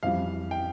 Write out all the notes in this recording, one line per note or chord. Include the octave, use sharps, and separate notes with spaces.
F2 E3 G3 F5
G5